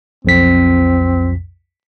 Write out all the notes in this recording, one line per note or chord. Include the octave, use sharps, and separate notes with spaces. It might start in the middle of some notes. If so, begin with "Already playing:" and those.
B1 F2 C4 B6